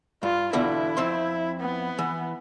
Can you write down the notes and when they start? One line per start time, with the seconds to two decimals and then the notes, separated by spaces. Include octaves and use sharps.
0.23 G2 F4
0.53 E2 B2 D3 E4
0.97 F2 C4 C6
1.60 B3
1.99 E3